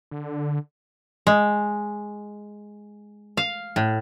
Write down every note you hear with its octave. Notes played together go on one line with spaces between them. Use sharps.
D3
G#3
F5
A2